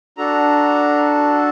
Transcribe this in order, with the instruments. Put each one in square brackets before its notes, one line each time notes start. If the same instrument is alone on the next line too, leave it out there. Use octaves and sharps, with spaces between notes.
[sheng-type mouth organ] D4 F#4 A4 A#5